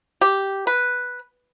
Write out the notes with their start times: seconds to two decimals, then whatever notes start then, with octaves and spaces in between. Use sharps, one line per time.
0.21 G4
0.67 B4